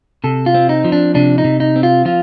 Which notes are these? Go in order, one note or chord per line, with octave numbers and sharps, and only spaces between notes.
C3 A4
F4
C4
D#4
F3
D4
C3 D4
D#4
C3
D#4
C4
F4
F3 F4